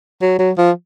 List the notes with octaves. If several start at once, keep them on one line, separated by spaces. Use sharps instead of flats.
F#3
F#3
F3